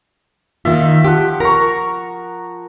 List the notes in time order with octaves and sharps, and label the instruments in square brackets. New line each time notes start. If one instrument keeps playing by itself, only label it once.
[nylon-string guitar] D#3 A#3 F4 [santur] E5
[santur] F3 F#5 [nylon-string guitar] G4
[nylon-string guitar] A#4 [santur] A#5 C#6